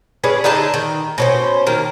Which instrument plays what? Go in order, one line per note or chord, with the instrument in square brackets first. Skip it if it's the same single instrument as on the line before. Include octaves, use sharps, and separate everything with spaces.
[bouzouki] C#4 D4 G#4 B4
D3 D#4 G#4 A5
D#3
B2 C#4 C5
D#3 A#3